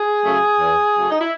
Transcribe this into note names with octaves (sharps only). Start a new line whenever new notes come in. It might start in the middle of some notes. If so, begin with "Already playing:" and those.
Already playing: G#4
C#3 F#3 A3
E2
C#3 F#3 A3
D#4
E4